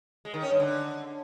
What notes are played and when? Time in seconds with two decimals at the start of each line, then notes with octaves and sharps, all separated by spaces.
0.25 G#3
0.34 D#3
0.42 C#4
0.51 G2
0.60 D3